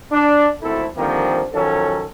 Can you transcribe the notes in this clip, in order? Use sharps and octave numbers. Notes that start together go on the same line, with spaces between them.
D4
G#1 D2 A3 C4 E4 A4
D3 D#3 F3 G3 A#3 C4
D#3 F3 F#3 C#4 A4